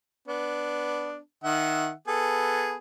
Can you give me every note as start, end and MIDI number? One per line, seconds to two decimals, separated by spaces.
0.28 1.18 59
0.28 1.18 62
1.44 1.91 51
1.44 1.91 76
1.44 1.91 78
2.08 2.76 59
2.08 2.76 68
2.08 2.76 69